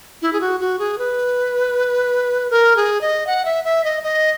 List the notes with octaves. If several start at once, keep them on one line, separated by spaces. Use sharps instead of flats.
E4
G#4
F#4
F#4
G#4
B4
A#4
G#4
D#5
F#5
E5
E5
D#5
D#5